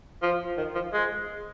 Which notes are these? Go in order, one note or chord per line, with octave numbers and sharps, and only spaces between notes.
F3
D#3
F3
G#3